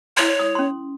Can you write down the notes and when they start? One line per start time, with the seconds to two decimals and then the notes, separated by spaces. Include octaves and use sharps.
0.17 E4 C#5 C6
0.39 D#6
0.55 C#4 C6